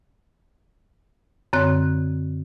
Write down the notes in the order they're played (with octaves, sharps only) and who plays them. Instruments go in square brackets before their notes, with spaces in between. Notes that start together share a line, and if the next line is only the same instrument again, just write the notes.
[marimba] F#2 D3 C4 C#5 F#6